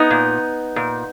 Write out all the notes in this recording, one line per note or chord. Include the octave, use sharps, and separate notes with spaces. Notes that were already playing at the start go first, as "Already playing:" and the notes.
Already playing: B3 D#4
A#2
A#2